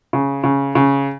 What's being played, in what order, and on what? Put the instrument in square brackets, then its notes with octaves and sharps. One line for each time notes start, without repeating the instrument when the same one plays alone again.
[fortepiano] C#3
C#3
C#3